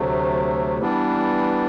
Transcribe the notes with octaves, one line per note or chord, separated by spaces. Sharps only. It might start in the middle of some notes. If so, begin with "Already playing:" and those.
Already playing: D2 C3 F#3 A3
E3 G3 B3 D4